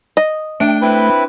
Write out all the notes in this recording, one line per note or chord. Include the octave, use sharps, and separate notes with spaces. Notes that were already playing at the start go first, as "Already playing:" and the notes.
D#5
A3 D4 G5
C4 E4 B4